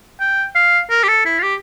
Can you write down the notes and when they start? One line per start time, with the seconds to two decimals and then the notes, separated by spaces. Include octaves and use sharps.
0.20 G5
0.55 F5
0.90 A#4
1.03 G4
1.08 A4
1.25 E4
1.39 F4
1.43 G4